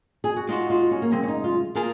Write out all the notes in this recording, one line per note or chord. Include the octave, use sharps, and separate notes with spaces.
G#4
F#4
G#3 D#4 F4 F#4
F4
C#4
A#3
F#2 C#3 G#3 C4
C#4
D#4
F4
A#3 F4 G#4 A#4